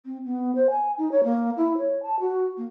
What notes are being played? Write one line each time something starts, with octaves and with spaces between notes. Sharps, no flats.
C4
B3
C5
G#5
D#4
C#5
A#3
E4
C#5
A5
F#4
A#3